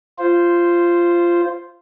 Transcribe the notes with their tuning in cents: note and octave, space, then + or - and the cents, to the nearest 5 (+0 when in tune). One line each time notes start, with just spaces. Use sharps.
F4 -15 C5 +0